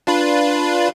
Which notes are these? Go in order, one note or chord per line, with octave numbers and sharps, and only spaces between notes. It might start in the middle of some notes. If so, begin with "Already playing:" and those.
D4 F4 B4